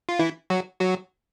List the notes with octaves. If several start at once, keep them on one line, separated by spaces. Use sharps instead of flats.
F4
E3 E4
F#3 F#4
F#3 F#4